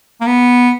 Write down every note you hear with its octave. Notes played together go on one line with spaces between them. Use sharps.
A#3
B3